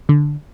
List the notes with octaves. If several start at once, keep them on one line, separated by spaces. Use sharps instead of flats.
D3